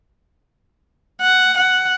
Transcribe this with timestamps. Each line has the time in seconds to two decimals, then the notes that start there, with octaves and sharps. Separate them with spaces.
1.21 F#5
1.57 F#5